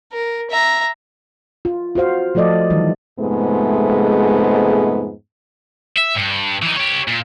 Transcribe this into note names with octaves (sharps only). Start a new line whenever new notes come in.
A#4
E5 A#5
F4
F4 F#4 C5 F5
F3 A3 A4 D5 D#5
D#3 E3 G3
F2 G#2 C3 G#3 A3 B3
E5
G2
E3 D#4
G4 C#5
A#2